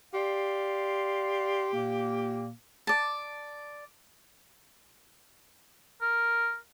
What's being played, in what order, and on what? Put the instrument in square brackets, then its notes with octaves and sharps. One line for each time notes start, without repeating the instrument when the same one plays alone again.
[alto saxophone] G4 [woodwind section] D5 F5 C6
[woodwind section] A#2 A#3
[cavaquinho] D5 A5
[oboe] A#4